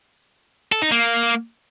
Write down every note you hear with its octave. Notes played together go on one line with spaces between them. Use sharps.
A4
D#4
A#3